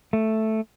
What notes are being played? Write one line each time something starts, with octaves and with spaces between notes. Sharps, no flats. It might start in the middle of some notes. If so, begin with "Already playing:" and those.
A3